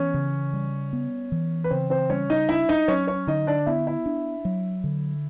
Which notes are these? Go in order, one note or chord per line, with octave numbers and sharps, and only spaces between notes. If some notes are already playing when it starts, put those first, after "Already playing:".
Already playing: E3 B3 C#4 C#5
C#3
G3
B3
E3
B4
C#3 C4 C5
C4 C5
G3 C#4 C#5
D#4 D#5
D4 E4 E5
D#4 D#5
F#3 C#4 C#5
C#4 C#5
D3 D#4 D#5
D4 D5
B3 E4 E5
E4 E5
D4
F#3
D3